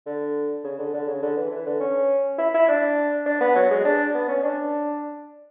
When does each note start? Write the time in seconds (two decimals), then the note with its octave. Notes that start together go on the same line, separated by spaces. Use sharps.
0.06 D3
0.64 C#3
0.79 D3
0.94 D3
1.07 C#3
1.22 D3
1.37 E3
1.51 E3
1.66 D3
1.80 C#4
2.39 E4
2.54 E4
2.68 D4
3.26 D4
3.41 B3
3.56 F#3
3.71 G#3
3.85 D4
4.14 B3
4.29 C#4
4.43 D4